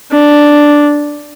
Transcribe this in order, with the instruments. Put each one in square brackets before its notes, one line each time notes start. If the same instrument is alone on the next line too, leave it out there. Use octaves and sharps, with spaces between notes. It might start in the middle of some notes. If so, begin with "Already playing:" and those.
[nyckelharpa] D4